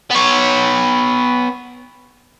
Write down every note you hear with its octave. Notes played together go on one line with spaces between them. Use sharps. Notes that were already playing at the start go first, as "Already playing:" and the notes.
B3 C#5